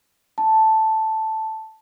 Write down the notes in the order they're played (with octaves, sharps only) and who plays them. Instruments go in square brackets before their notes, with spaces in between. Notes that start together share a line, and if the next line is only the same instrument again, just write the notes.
[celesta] A5